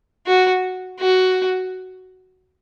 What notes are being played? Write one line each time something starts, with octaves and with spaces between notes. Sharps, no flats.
F#4
F#4